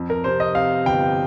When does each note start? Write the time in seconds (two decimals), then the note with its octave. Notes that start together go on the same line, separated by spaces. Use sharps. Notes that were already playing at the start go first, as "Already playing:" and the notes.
Already playing: F2
0.10 A#4
0.24 C3 C5
0.40 D#5
0.55 C3 F5
0.86 G1 G5